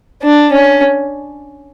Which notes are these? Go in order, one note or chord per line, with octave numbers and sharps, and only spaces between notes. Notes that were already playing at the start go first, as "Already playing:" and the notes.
D4
C#4